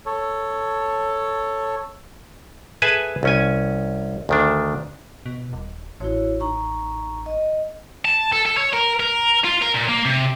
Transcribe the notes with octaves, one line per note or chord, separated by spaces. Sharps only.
A4 C#5
G#4 A4 B4 E5 G#5 A5
C2 C#4 G#5
D2 D#3 D4
B2
D#1
A1 E4 F#4 C#5
D#4 A#5 C#6
D#5
A5
A4
A4
C#5
A#4
A#4
F4
A#4
A#2
A#3
C3